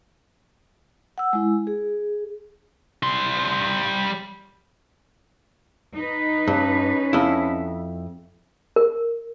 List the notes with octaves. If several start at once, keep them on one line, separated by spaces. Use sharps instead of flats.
F#5 E6
G#3 E4
G#4
G3 C6
D#4 B4
G2 C#4
F2 E4
A#4